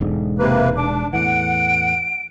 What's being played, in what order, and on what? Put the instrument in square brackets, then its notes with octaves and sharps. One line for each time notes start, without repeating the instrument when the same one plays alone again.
[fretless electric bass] E1 G#2 D3
[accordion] C3 A#3 B4
[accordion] D4 [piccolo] D6
[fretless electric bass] E2 A2 E3 [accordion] F#5 [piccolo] D7